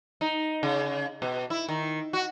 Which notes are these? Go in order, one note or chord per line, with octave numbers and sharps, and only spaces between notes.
D#4
C#3
B2
E4
D#3
F#4